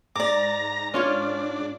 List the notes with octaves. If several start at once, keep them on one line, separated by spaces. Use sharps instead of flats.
G#2 D5 A#5 D6
C#4 D4 F4 C#5